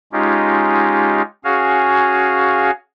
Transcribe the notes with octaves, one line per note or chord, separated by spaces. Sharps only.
G#3 C#4 D#4 F4 G4
C#4 F#4 G#4 F5 G#5